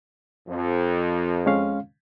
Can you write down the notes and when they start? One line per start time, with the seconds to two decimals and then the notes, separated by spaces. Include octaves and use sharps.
0.48 F2
1.46 G#3 C#4 F5